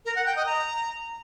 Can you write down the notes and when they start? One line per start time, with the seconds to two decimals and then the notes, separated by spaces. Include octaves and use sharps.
0.05 A#4
0.16 F#5
0.26 G5
0.36 D#5
0.46 A#5